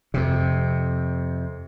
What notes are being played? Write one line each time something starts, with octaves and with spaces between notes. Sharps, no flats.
F2 C3